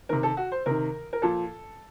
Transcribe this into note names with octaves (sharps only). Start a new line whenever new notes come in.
C3 D#3 A#4
A4
F#4
C5
C3 D#3 A#4
A#4
A#2 F3 A4